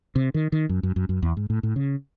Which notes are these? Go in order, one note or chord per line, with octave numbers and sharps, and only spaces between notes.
C3
D#3
D#3
F#2
F#2
F#2
F#2
E2
G#2
A2
A2
C#3